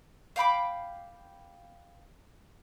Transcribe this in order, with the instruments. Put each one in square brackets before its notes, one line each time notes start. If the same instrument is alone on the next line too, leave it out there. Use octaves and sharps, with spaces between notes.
[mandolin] F5 G5 B5 D6